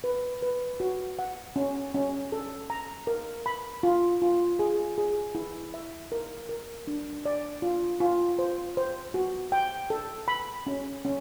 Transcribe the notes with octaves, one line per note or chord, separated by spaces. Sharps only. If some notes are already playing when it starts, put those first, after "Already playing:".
B4
B4
F#4
F#5
C#4
C#4
A4
A#5
A#4
B5
F4
F4
G#4
G#4
E4
E5
A#4
A#4
D4
D5
F4
F4
C5
C5
F#4
G5
A4
B5
C#4
C#4